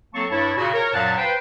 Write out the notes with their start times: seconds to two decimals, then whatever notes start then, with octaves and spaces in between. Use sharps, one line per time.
0.14 F#3 A#3 C4 A4 A5 C#6
0.30 G2 E4 C#5 A5
0.57 A#2 C#3 F#4
0.74 A#4 C#5
0.94 F#2 A#2 F#3 F5 F#5 A5
1.18 B4 C5 G5